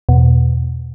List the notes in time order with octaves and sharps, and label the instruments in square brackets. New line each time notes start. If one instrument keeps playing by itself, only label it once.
[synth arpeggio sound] E2 B2